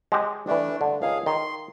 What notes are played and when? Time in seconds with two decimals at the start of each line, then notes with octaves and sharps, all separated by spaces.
0.12 G#3 G4 D#5
0.47 E3 G3 A3 D4
0.81 G2 D3
1.02 C#2 D#3 G#4 F5
1.26 D#3 C6